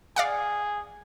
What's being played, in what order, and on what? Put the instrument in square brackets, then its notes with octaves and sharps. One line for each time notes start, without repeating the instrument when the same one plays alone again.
[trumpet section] G#4 [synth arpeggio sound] D5 F5 F#5